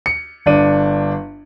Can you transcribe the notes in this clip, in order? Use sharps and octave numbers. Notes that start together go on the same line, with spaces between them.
C#7
G1 D4 D#7